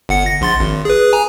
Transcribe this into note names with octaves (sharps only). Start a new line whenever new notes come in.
G1 F#5 C#7
A#6
A#1 C6 A6
G#1
G#4 B4
G#5 A#5